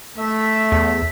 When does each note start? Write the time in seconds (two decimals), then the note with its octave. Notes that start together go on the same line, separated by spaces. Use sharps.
0.18 A3 E5
0.72 E2